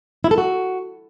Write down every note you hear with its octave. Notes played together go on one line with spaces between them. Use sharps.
E4
A4
F#4